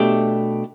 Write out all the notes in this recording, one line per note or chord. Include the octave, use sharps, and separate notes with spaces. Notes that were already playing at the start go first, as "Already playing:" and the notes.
Already playing: B2 A3 D4 G4